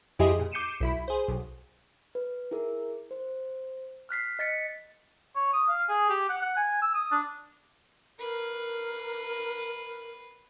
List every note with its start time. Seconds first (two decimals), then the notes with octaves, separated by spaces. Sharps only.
0.19 F2 E4 G4 G#4 D#5 C6
0.39 A#2
0.52 D6 G6 C7 C#7 D#7 E7
0.80 B1 E4 B5
1.08 G#4 C5
1.28 B1
2.15 B4
2.51 E4 G#4 A#4
3.11 C5
4.09 F6 F#6 B6 C7
4.39 D#5 A6 B6 C#7
5.35 C#5
5.53 D#6
5.69 F5
5.89 G#4
6.10 G4
6.29 F#5
6.42 F#5
6.57 G#5
6.82 E6
6.94 D#6
7.12 D4
8.20 A#4 B4 C7